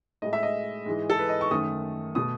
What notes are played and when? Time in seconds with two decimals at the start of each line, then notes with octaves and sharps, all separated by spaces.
0.22 A2 G#3 D#5
0.33 E5
0.43 D#5
0.86 G#2 E3 G#3
1.10 A4
1.19 B4
1.29 D#5
1.41 C#6
1.51 F#2 D#3 A3 D#6
2.15 B2 A3 D#6